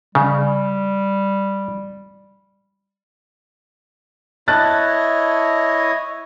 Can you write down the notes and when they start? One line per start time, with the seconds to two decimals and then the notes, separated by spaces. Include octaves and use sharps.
0.15 C#3 G3
4.48 E4 C#5 D#5 A5 F#6 A6